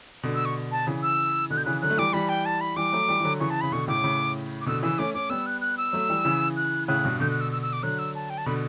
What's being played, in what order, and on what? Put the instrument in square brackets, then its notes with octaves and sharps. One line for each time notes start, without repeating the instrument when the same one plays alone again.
[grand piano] B2 D3
[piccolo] E6
C#6
A5
[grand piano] C#3 E3
[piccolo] E6
[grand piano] B2 D3 [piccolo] F#6
[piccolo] G6
[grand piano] C#3 E3 [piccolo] F#6
[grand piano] D3 F#3 [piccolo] F#6
[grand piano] A3
[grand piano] E3 G3 [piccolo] D6
[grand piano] E3 G3 [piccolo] B5
[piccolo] G5
A5
B5
[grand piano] E3 G3 [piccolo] D6
[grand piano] F#3 A3
E3 G3
E3
D3 F#3
[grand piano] C#3 E3 [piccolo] C#6
[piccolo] A5
[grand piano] C#3 [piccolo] B5
[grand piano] B2 D3 [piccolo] C#6
[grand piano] A2 C#3 [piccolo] D6
[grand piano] A2 C#3
[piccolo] D6
[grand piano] B2 D3 [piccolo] E6
[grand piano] C#3 E3 [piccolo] E6
[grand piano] A3 C#4 [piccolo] D6
[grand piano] A3 C#4 [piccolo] D6
[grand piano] G3 B3 [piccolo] E6
[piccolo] F#6
F#6
E6
[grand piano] F#3 A3
E3 G3
C#3 E3
[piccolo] F#6
[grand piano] A2 C#3 [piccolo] F#6
[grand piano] G2 B2
[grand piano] B2 D3 [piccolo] G6
[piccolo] F#6
E6
E6
E6
D6
[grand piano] D3 F#3 [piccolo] F#6
[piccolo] E6
A5
G5
A5
[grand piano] B2 D3 [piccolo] B5